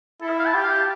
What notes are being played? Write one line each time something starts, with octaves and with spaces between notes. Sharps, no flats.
E4 A4
E5
F5
A5
G4 G5
F5
G5
A5